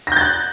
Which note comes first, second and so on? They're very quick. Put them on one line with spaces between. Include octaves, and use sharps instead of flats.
A#6 G6 A6 F#6